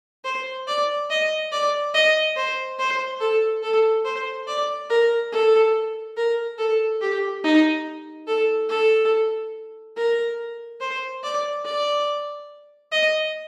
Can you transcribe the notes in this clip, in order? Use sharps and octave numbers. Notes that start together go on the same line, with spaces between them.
C5
D5
D#5
D5
D#5
C5
C5
A4
A4
C5
D5
A#4
A4
A#4
A4
G4
D#4
A4
A4
A#4
C5
D5
D5
D#5